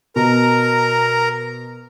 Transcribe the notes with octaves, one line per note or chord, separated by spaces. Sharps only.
B2 A#4 A#5